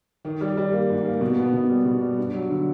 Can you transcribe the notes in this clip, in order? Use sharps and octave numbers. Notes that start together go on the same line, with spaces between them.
D#3
G3
G3
A#3
G#2
A#3
B2
B3
B2
G3
B2
G3
G2
F#3
D3